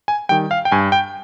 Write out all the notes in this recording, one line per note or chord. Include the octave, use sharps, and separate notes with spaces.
G#5
D#3 G3 G5
F5
G5
G2 G#5
G5